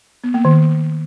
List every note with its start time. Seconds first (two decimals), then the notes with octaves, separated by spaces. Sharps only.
0.24 B3
0.34 A#3
0.45 D#3